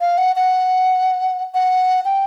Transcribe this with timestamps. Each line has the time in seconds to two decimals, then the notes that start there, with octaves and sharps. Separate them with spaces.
0.01 F5
0.18 F#5
0.36 F#5
1.54 F#5
2.05 G5